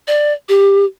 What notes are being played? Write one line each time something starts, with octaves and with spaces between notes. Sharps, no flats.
D5
G4